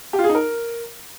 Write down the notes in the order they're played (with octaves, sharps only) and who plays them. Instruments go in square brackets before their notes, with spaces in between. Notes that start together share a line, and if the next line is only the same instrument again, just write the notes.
[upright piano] G4
F4
G#4
D#4
A#4